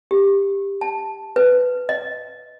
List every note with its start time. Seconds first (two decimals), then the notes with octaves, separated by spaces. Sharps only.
0.11 G4
0.81 A5
1.36 B4
1.89 D#5